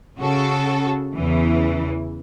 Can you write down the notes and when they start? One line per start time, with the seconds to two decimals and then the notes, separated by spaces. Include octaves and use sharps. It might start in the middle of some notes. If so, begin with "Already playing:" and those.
0.19 C#3 F#4 A4
1.15 E2 C#3 E3